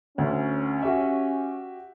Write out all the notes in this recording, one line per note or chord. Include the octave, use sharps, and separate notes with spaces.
D2 C#4
F#4 G4 E5